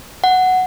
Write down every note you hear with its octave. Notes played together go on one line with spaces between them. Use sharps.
F#5